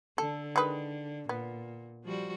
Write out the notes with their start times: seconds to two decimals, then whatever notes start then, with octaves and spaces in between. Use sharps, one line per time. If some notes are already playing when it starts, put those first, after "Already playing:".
0.18 D3 A4
0.56 D#3 G#3 B4
1.29 A#2 B3
2.04 F3 G3 F#4